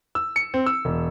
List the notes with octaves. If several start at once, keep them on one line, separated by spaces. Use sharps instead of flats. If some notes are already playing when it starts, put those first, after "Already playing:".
E6
C#7
C4
E6
E1